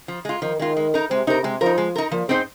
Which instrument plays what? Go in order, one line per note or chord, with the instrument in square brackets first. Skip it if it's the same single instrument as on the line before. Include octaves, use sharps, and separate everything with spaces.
[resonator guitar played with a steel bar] F3
G#3 F4
[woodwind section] D#3 [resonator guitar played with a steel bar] F3
[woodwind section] D#3 [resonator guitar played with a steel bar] G#3 F4
[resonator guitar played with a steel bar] G#3
D#4 A#4
[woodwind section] C3 [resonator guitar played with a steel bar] G#3
[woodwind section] C3 [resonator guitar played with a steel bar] D#4 A#4
[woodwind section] C3 [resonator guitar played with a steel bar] G#3
[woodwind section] F3 [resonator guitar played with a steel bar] D#4 A#4
[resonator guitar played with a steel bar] G#3
D#4 A#4
[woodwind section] A#2 [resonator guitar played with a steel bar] F3
[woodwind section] G#2 [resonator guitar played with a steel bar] C4 D#4 C5